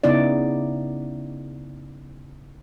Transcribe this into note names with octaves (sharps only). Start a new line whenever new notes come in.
C#3 B3 D#4 E4 D5